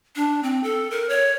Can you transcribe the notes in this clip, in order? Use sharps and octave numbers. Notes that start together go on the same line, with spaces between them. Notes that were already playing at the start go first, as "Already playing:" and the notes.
D4
C4
A4
A#4
C#5